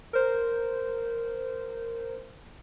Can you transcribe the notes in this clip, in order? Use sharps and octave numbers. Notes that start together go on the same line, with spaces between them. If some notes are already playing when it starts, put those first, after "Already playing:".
A#4 C5